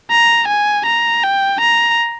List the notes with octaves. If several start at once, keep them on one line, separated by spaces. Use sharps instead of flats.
A#5
G#5
A#5
G5
A#5